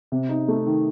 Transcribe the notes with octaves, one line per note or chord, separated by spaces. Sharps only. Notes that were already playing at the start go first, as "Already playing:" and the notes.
C3
D#4
A3
D#3